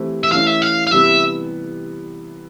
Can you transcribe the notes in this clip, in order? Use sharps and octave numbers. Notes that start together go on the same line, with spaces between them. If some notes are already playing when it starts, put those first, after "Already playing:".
Already playing: E3 A3 C4 E4 G4
E5
E3 A3 C#4 F5
E5
F5
F5
C3 E3 G3 B3 E5